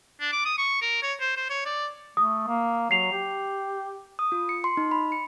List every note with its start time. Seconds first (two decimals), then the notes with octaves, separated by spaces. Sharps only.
0.20 D4
0.32 D6
0.45 D#6
0.58 C#6
0.82 A#4
1.03 C#5
1.20 C5
1.37 C5
1.50 C#5
1.66 D5
2.17 A3 D#6
2.48 A#3
2.91 F#3 C7 F7
3.12 G4
4.19 D#6
4.32 F4
4.49 C#7
4.64 C6
4.77 D#4
4.91 B5
5.12 C#7